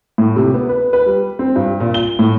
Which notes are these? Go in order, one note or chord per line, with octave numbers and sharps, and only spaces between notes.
A2
C3
B3
B4
B4
G3
C4
G2
A#2
G7
A2